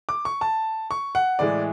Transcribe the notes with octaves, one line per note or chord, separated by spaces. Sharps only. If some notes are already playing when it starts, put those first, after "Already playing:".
D6
C#6
A5
C#6
F#5
A2 E3 G#3 D5